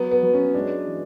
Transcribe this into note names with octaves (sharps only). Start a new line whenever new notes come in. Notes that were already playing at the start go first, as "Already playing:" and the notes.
Already playing: F#3 B3
B3
F#3
C#4
G#3 D4
E3